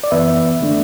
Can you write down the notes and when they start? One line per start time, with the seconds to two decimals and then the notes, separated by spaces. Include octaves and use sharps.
0.04 D5
0.11 F#2 E3 B3 B4 E5
0.61 D3 A3 D4